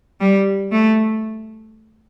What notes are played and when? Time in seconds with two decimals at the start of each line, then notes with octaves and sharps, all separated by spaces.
0.21 G3
0.72 A3